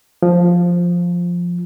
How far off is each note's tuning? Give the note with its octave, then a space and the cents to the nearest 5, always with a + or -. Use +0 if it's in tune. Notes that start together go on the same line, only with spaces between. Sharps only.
F3 +5